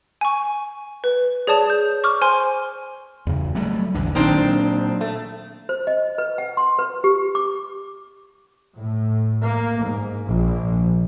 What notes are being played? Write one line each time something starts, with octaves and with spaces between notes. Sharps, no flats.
G#5 C#6
B4
G#4 C#5 D5 A5 D#6 E7
G6
C#6 D6 F6
C5 G#5 C6
E2 C#3
F#3 G3 A3
A#1 E2 D3
A#2 D#3 F#3 C4 D4
A3
C5
D#5
B4
F#5
C6
B4
G4
D6
A2
A#3
G#2
A#1